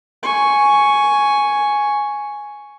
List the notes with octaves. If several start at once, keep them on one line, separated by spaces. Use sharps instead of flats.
G#5 C#6